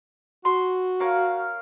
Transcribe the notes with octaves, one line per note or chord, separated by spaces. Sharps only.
F#4 C6
A#4 C#5 F5